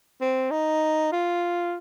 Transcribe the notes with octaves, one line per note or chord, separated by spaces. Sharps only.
C4
D#4
F4